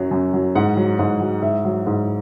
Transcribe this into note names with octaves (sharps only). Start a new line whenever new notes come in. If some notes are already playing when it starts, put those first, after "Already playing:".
Already playing: F#2 F#3
F#2
F#3
G#2 F#5
F#3
G#2
F#3
G#2 E5
F#3
G#2